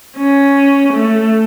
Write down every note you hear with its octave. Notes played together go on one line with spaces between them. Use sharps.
C#4
A3